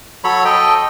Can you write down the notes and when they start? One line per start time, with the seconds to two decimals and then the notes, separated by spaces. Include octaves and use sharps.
0.24 F#3 A4 C#5 B5
0.45 A4 D#5 G5